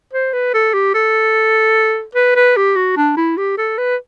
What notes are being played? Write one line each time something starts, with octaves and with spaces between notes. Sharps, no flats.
C5
B4
A4
G4
A4
B4
B4
G4
F#4
D4
E4
G4
A4
B4